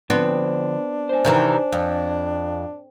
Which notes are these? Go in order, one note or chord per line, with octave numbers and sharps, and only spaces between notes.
D3 F3 B3 C4 D4
C5 G#5
C3 D#3 E3
F2